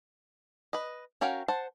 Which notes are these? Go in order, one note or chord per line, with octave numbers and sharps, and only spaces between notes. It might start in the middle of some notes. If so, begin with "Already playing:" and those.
B4 D#5
C#4 F#4 A#4 F5 G5
C5 F#5 A5